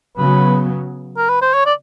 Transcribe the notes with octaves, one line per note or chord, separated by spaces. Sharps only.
C#3 F#3 B3 B4
A#4
B4
C5
C#5
D5